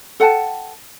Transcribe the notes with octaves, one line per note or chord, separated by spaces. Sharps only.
A4 F#5 G5 A5